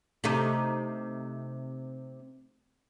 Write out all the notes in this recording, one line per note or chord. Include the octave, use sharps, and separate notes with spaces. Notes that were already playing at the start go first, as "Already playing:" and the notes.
C3 A3 D#4